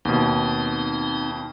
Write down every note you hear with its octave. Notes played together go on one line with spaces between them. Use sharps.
D#2 B2 C4 D#4